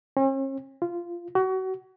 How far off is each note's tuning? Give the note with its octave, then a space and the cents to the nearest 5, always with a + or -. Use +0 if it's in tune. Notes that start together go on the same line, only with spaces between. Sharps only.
C#4 -45
F4 -15
F#4 +30